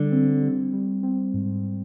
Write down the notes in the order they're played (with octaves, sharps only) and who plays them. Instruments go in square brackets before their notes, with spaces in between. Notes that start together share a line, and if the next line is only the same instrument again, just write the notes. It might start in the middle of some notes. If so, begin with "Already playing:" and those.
Already playing: [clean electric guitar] D3 [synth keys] G3
[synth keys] C4
G3
G3
C4
G#2